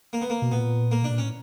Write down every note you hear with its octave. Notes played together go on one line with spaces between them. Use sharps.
A#3
B3
A#3
B2
A#2 B3
A#3
B2 D4
A#2
C#4
A2